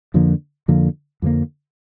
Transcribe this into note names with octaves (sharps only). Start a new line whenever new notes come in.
F2 D3 F3 A#3
F2 D3 F3 A#3
F2 D3 F3 A#3